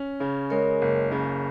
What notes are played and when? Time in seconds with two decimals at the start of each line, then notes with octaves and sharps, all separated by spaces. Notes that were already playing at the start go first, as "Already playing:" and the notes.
Already playing: C#4
0.20 C#3
0.50 G#3 A#4 C#5
0.82 F#1
1.12 C#3